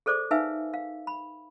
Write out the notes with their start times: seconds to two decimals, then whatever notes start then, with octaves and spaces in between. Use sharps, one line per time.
0.06 G#4 A4 C5 D5 D6
0.31 D#4 B4 E5 F5 G#5 E6
0.74 F5
1.07 B5